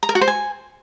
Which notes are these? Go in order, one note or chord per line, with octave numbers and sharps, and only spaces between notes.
A#5
A#4
F#4
C5
G#5